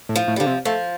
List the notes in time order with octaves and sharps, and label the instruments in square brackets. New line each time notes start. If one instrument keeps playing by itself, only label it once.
[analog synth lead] A2
[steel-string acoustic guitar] F3
[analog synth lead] A2
[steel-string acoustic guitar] G3
[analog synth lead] D3 [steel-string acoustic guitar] F3
[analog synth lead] C3
[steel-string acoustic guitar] F3 [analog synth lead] A3